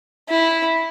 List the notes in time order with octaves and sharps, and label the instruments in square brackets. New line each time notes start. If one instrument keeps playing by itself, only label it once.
[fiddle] E4